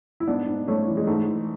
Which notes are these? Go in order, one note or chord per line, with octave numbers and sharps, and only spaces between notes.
E4
G#2 B3 D4
G#2
G#2 A3 C#4
E3
G#3
G#2 A3
E3